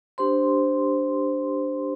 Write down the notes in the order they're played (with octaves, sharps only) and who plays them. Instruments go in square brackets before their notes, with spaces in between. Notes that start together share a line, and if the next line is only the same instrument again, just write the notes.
[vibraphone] D4 G4 C5 C6